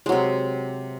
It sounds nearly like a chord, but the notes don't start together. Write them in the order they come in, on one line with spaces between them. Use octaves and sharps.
G#3 F#3 C3